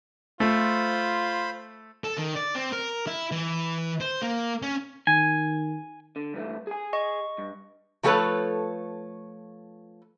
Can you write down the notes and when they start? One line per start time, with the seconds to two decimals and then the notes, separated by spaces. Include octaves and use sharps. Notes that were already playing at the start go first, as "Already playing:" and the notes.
0.40 A3 F4 C5 B5
2.04 A4
2.17 D#3
2.36 D5
2.55 C4
2.72 A#4
3.07 E4
3.32 E3
4.01 C5
4.22 A#3
4.62 C#4
5.07 D#3 G#5
6.16 D3
6.34 G2 E3 A3
6.67 G#4 G#5
6.93 D#5 C#6
7.38 G2
8.03 F3 A3 G4 A4 B4 C#5